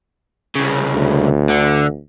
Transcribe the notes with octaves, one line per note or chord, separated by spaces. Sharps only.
C2 C#3
D2
D3